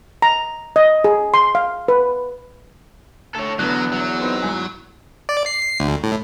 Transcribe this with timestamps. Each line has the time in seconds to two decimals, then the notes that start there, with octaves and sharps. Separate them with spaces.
0.22 A#5
0.76 D#5
1.04 G#4
1.34 C6
1.55 F5
1.88 B4
3.35 D2 A4 C#5
3.59 E2 D3 F#3 B3 F#6
3.92 F#3
4.20 B3 C4 D#4
4.42 G#1 E2 G#5
5.29 D5
5.46 C7
5.80 D2
6.04 A2